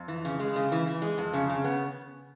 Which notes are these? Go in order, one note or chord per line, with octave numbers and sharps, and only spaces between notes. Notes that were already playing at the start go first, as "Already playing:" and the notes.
Already playing: F2
E3
C#3
G#3
C#3
E3
E3
G#3
F2
C#3
C#3
B3